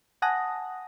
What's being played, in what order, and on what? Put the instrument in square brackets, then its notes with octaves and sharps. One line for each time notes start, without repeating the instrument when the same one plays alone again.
[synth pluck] F#5 G#5 A5 D#6 F#6 A#6